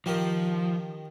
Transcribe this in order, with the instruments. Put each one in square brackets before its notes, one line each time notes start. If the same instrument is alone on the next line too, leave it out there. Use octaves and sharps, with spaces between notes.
[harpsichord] D#3 G4 A#4 [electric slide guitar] F3